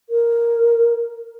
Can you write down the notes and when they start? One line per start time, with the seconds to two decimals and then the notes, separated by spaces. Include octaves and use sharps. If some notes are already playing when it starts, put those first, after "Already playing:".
0.10 A#4